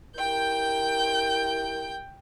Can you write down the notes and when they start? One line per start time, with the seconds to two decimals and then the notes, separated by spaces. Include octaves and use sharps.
0.17 E4 G4 A#4 G5 G6